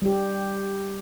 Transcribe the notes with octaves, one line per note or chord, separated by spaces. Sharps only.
G3 G4